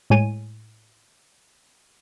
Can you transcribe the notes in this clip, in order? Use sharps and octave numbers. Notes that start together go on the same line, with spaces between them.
A2 G#3 C#5 G#5 D#7